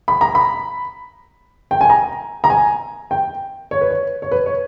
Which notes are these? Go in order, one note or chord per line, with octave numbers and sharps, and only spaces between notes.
B5
A#5
B5
G5
G#5
A#5
A#5
G#5
G5
C#5
B4
C#5
C#5
B4
C#5